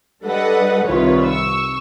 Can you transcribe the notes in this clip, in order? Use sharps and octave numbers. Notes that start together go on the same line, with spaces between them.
G3 D4 A4 B4 D#5 F#5
C2 D#3 F4 B4 C#5
C#6 E6